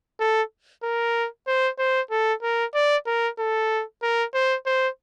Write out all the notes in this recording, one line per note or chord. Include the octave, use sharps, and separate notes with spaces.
A4
A#4
C5
C5
A4
A#4
D5
A#4
A4
A#4
C5
C5